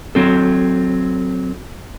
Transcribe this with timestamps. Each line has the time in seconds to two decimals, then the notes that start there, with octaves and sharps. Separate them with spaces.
0.15 F#3 C4 A4